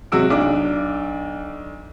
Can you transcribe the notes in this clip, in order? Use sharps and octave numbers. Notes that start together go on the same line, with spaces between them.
C3 F#3 G#3 F#4 E6 D7
B1 D4 D6